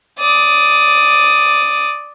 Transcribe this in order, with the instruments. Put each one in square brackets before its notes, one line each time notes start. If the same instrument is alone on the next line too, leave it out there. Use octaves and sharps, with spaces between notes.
[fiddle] D5 D#6